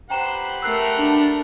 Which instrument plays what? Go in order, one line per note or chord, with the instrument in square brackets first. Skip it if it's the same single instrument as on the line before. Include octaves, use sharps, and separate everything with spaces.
[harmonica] G4 B4 F#5 [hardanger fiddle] C5 [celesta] G5 A#5 E7
[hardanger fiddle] A3 A#4 [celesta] E6 F#6 C7
[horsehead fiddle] D4